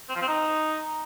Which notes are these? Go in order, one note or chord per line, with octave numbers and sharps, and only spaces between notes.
C4
F3
C4
D#4